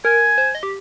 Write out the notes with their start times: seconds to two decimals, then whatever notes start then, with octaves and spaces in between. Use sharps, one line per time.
0.05 A#4 G#5
0.38 C5
0.55 D#5
0.63 G4